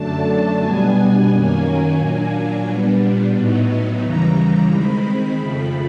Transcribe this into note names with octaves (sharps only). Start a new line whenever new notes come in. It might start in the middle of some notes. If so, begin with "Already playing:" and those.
Already playing: F#2 D3 F#3 A3 D4 A5
B2 G3 B3 D4 G#5
F#2 D#3 F#3 A#3 C#4 G#5
A#2 F#3 A#3 D4
A#2 G3 B3 D4
A2 F#3 B3 D#4
D#2 C#3 E3 G3 A#5
D#3 G#3 C4 B5
F2 C#3 F3 A3 B5